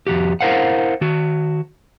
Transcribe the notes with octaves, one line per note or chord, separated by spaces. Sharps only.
F2 E3 F#4 G4
E4 A#4 C5 F5 F#5
D#3 F#4